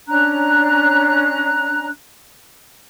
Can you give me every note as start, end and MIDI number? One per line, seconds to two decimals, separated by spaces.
0.07 1.87 61
0.07 1.87 62
0.07 1.87 82
0.07 1.87 90